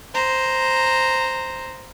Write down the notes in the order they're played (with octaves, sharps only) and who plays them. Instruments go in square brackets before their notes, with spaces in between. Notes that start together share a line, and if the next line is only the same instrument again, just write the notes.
[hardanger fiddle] C5 A#5